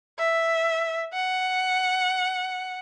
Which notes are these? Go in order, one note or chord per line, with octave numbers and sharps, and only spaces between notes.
E5
F#5